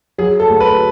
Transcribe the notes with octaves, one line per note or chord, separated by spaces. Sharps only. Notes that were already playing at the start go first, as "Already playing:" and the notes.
F#3 G#4
A4
D2
B4